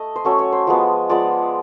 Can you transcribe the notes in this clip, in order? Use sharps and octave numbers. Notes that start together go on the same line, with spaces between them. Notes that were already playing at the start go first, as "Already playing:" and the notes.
Already playing: A3 D#5
C5
F#3 A3 C#4 C#5
C#5
C5
F3 G#3 B3
F3 G#3 B3 D5